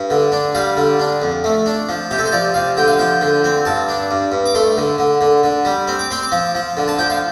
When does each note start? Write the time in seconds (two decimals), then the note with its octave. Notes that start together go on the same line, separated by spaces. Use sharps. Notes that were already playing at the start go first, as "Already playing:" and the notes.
Already playing: G2
0.10 D3
0.32 D4
0.55 G3 F5
0.77 D3
1.00 D4
1.22 F2
1.44 A3
1.66 D4
1.89 F3
2.11 C3 G4
2.19 A4
2.25 C5
2.32 F3 D5
2.54 C3 F5
2.77 D3 G5
2.88 F5
2.99 F3 G5
3.21 D3
3.44 C4
3.65 G2 A5
3.89 D4
4.11 G2
4.32 G2
4.46 D6
4.55 A3 C6
4.77 D3
4.98 D3
5.21 D3
5.43 D3
5.65 G3
5.88 C4
5.99 D6
6.11 C4 C6
6.23 D6
6.32 F3
6.55 F3
6.77 D3
6.88 A5
6.98 F3 G5
7.10 F5